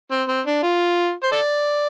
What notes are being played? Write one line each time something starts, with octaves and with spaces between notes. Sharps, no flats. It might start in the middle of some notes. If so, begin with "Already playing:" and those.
C4
C4
D4
F4
C5
A4 D5